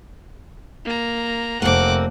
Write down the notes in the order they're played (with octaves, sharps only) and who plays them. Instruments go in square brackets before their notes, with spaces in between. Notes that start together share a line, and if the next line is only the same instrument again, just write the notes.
[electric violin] A#3 A#5
[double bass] F1 A3 [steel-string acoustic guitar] A#3 C4 [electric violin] F#5 D6